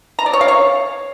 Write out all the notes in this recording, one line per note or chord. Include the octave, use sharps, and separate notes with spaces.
A#5
D5
C#5
F5
C#5